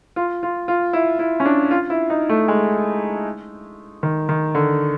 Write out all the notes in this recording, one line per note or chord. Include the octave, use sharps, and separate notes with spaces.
F4
F4
F4
E4
E4
C#4
D4
F4
E4
D#4
A3
G#3
D#3
D#3
D3